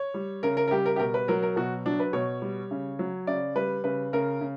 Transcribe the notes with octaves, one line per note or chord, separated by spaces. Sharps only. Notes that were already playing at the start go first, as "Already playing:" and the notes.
Already playing: C#5
G3
C#3 A#4
A#4
A#4
G3 G4
A#4
G4
B2 A#4
B4
F#3 A#4
A#4
B2 F#4
F#3 D4
B4
B2 C#5
G3
C#3
F#3
C#3 D5
G3 B4
C#3 B4
C#3 A#4
C#3